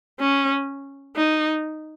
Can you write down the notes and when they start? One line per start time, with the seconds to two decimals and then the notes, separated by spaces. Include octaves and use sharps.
0.20 C#4
1.16 D#4